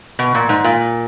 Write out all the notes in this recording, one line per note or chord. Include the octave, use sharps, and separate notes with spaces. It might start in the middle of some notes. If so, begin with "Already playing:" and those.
B2
A#2
G#2
A#2